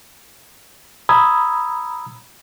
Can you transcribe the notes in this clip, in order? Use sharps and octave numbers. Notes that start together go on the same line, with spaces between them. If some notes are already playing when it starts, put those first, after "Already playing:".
A#5 B5 D#6 E6 G#6